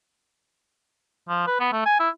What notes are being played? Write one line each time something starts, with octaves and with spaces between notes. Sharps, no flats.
F3
B4
B3
A3
G#5
E4